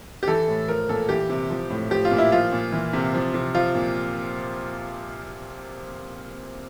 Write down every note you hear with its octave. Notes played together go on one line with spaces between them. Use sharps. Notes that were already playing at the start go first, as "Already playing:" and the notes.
G4
E3 A4
A2
F3 A#4
A#2 A4
E3 G4
C3
F3
A2
F3 G4
F4
A#2
E4
F3 F4
A#2
E3
C3
F3
C3
F3 F4
A#2